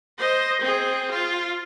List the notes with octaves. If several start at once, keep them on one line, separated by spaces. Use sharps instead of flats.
C5 D#5
C4 G#4
F4